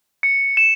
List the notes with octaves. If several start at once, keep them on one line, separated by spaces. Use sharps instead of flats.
C#7
E7